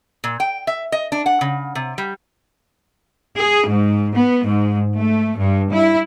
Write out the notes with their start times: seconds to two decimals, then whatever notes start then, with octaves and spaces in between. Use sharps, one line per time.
0.24 A#2
0.40 G5
0.67 E5
0.92 D#5
1.12 D4
1.26 F#5
1.41 C#3
1.75 C3
1.98 G3
3.37 G#4
3.69 G#2
4.16 B3
4.47 G#2
4.96 A3
5.39 G2
5.73 E4